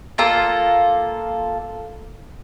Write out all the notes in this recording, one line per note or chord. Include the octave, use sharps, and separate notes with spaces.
A#3 F4 A4 A#5